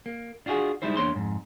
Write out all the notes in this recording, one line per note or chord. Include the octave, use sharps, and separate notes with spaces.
A#3
D4 F4 F#4 G#4
G3 G#3 D#4 E4 C5
E2 A#3 D4 C#5 C6
F2 G#2